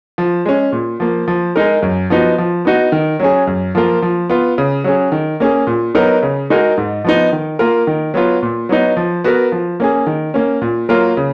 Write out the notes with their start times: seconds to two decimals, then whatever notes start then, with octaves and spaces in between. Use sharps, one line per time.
0.18 F3
0.45 G#3 C#4
0.72 A#2
1.00 F3 A#3
1.28 F3
1.56 G#3 D#4 A#4
1.82 F#2
2.10 F3 B3 D#4 F#4
2.38 F3
2.65 B3 D#4 F#4
2.92 D#3
3.20 F#3 C#4 G#4
3.47 F#2
3.75 F3 A#3 F4 A#4
4.02 F3
4.30 B3 F4
4.58 C#3
4.84 F#3 C#4 G#4
5.12 D#3
5.40 A#3 C#4 G#4
5.67 A#2
5.95 F#3 B3 D#4 A#4
6.23 C#3
6.50 G#3 D#4 F#4 A#4
6.78 G#2
7.04 F3 B3 D#4
7.32 D#3
7.59 A#3 F4 A#4
7.87 D#3
8.14 F#3 B3 F4
8.42 A#2
8.69 F#3 B3 D#4
8.97 F3
9.24 B3 F#4 A#4
9.52 F3
9.80 A#3 C#4 G#4
10.07 D#3
10.34 A#3 C#4
10.61 A#2
10.89 F#3 A#3 F4 A#4
11.17 C#3